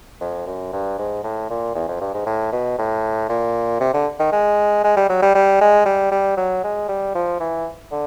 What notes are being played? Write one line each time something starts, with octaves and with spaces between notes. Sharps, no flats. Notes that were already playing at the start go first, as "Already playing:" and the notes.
F2
F#2
G2
G#2
A2
A#2
E2
F2
G2
G#2
A2
B2
A2
A#2
C3
D3
D#3
G#3
G#3
G3
F#3
G3
G3
G#3
G3
G3
F#3
G#3
G3
F3
E3
D3